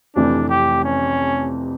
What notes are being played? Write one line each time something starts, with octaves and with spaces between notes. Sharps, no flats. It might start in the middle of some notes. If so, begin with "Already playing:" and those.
F1 F2 C3 E3 A3 D4
G4
C#4